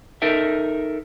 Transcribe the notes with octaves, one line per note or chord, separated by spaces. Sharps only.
D#4 A4 A#4 E5